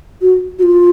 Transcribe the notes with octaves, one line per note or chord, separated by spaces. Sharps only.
F#4
F#4
F4